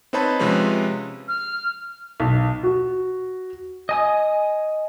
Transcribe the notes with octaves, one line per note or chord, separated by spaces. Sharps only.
C4 D#4 B4 C#5 A5 B5
C3 F3 G#3 C#4 B4
F6
B1
F#4
D#5 G#5 D#6